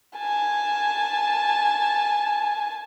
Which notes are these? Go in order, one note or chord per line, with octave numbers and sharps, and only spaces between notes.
G#5 A5